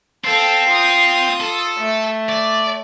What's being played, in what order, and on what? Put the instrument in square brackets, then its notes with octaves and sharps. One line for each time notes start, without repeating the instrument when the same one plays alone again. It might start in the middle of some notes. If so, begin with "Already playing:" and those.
[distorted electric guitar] C4 [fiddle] A4 F5
[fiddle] F4 D#6
[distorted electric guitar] A4
[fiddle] A3
[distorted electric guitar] D5